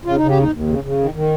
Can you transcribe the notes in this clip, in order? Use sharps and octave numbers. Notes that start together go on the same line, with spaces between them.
C#3 F4
C#3 D#4
G4
D#2 D#4
D#2
C#3
C#3
D#3
D#3